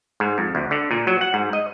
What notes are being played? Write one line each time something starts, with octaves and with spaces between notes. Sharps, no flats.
G#2
F2
D2
D3
A#2
F#3
F#5
G#2
D#5